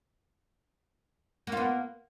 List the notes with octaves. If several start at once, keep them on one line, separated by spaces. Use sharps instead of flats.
A#3 B3 F4